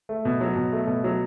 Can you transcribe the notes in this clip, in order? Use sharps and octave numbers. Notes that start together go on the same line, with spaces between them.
A3
B2
F#3
B2
A3
B2
F#3